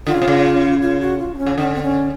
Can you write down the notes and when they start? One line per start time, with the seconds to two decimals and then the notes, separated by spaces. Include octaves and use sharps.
0.07 D3 F4
0.14 C#3
0.22 C3
0.28 C#3
0.81 F4
1.01 F#4
1.19 F4
1.34 D4
1.38 C#4
1.46 C#3
1.58 D3 C#4
1.75 C4
1.83 C#4